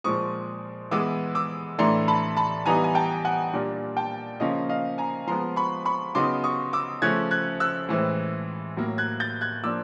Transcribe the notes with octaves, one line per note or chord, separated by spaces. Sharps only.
A#2 F3 G#3 C4 C#6 D#6
E3 G#3 B3 D6 E6
D6 E6
A2 E3 A3 D4 A#5 C6
A5 B5
A5 B5
E3 G3 B3 D#4 G#5 A#5
G#5
G5 A5
F#5 G#5
A#2 G3 A#3 D4
G5 A5
C#3 F3 A#3 C#4 D#5 F5
D#5 F5
G#5 A#5
F3 G#3 B3 A#5 C6
B5 C#6
B5 C#6
C#3 F#3 B3 D#4 C6 D6
C#6 D#6
D6 E6
C#3 F3 A3 C#4 F#6 G#6
F#6 G#6
E6 F#6
A2 E3 G#3 C4
A2 F#3 A#3
F#6 G#6
G6 A6
F#6 G#6
F3 A#3 D4 D6 E6